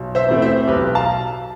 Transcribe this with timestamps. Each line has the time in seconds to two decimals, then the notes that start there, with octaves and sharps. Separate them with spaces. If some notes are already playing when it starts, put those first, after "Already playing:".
Already playing: B1
0.15 C5 E5
0.29 A2 E3 A3 C4
0.42 C5 E5
0.68 B1 G4 B4
0.95 F5 A5